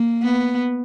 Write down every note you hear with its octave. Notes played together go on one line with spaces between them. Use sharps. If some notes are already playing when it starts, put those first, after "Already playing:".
Already playing: A#3
B3